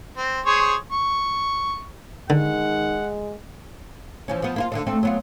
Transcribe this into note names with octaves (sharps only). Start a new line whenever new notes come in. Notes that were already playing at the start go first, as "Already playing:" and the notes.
C4
G#4 C5 C#5
C#6
D3 D#3 G#3 F#5
E3 F3 C#4
F3 B3
A#3 E4 F4
D3 G#3 D4
A3 C4 D4
F#3 B3 F4